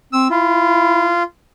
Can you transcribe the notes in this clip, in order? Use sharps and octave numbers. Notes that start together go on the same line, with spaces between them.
C4 E6
E4 F4